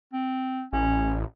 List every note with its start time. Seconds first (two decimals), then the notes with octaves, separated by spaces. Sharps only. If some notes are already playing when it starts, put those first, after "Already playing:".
0.13 C4
0.73 A1 C#4